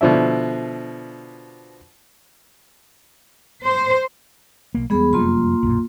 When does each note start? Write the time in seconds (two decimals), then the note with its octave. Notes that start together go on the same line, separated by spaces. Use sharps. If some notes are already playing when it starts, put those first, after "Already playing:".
0.01 B2 D3 F3 D4 E4
3.65 C5
4.74 B1 A#3
4.90 E2 G3 G#3 B3 G#4 B5
5.13 F1 F#2 G3 A#3 F4 C6
5.63 B1 F#2 A#2